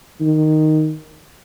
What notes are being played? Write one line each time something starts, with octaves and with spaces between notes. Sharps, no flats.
D#3